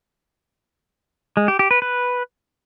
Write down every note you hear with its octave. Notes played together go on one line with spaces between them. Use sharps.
G#3
G4
G4
B4
B4